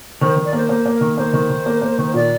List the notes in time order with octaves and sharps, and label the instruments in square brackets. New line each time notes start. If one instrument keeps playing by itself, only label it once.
[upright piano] D#3 [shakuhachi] C5
[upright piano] D#3
[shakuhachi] D5
[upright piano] A#3 [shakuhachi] C5
[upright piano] A#3 [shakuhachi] C5
[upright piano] A#3
[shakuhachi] A#4
[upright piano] D#3
[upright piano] A#3 [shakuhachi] C5
[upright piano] D#3
D#3
A#3
A#3
D#3
[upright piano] A#2 [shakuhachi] D5